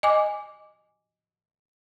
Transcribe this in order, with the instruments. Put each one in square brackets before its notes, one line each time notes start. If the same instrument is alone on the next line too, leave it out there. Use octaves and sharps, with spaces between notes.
[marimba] D#5 G#5 D6